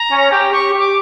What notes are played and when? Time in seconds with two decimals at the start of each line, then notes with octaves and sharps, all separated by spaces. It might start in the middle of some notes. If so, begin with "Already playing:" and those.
Already playing: A#5
0.12 C#4
0.32 G4
0.52 G4 C#6
0.73 G4
0.79 D6